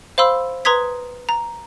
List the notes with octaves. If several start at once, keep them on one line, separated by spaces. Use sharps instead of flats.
C5 F5 B5 C6 E6
B4 A#5 C6 D#6 G#6 B6
A#5